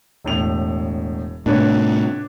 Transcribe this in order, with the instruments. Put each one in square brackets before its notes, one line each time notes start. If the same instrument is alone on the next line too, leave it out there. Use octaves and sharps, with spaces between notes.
[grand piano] E1 A2 F7
[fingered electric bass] A2 C3 [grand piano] D4 B4 C#5